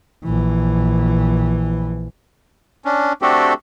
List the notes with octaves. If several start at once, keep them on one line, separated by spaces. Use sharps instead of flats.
A#1 E3
C#4 D4
A3 C4 D4 F#4 G4 A4